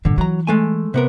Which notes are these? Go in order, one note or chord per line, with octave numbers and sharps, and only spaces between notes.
G2 A#2 D3
E3 F#3 A#5
G#3 A3 G#5
C3 B3 A#4